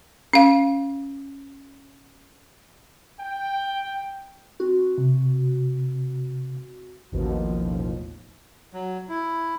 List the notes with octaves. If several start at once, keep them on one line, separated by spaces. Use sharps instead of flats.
C#4 F5
G5
C4 F#4
C3
A1 D#2 B2 F3
F#3
E4